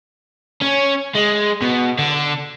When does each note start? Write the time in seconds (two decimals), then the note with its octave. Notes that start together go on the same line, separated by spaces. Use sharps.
0.62 C#4
1.15 G#3
1.62 B2
1.99 D3